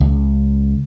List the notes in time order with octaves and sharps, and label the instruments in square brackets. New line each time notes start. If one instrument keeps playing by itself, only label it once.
[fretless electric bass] C#2